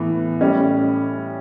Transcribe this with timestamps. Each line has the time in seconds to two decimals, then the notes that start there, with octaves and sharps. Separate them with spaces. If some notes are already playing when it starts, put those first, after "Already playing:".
Already playing: A2 E3 B3
0.41 A2 G3 C#4